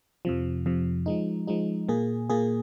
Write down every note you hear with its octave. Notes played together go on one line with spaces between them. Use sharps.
F2 C3 F3
F2 C3 F3
F3 G#3 D#4
F3 G#3 D#4
A#2 A#3 G#4
A#2 A#3 G#4